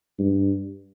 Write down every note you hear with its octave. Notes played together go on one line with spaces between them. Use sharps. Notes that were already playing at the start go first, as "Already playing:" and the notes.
G2